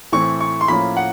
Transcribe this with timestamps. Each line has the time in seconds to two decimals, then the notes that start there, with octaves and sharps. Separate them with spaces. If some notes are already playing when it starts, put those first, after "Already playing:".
0.12 A2 E3 A3 C4 C#6
0.40 C#6
0.61 C6
0.68 A2 F3 A#3 C#4 B5
0.97 F#5